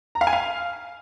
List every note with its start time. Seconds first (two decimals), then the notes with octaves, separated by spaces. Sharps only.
0.15 A#5
0.21 F5
0.27 G#5
0.33 F5